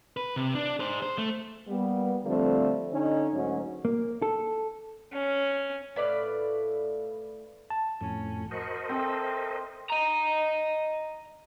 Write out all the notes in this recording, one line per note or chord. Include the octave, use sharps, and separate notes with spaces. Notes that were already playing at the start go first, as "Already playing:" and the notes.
B4
C3
D4
G#4 C5
C5
A3
G3 A#3 B3
D3 F3 G3 A3 C4
D3 C#4 D#4
D2 G#2 F#3 C#4
A#3
A4
C#4
A2 B4 D5 F5
A5
F2 A2 C#4
F#4 A#4 C5 D#5
C4 A4 E5
D#5 A#5